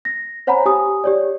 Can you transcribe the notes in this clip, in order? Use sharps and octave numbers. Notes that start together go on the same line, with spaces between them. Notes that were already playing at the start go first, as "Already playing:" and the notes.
A#6
C5 C#5 F#5 G#5 A#5 B5
G4 G#5 D#6
G4 C#5 D5